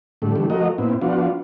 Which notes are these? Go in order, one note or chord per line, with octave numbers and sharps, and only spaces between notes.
A2 D3 G3 A3
D3 E3 G3 A3
F3 A3 F#4 A#4 D#5
A#2 B3 C4 E4
F3 B3 D4 F4 F#4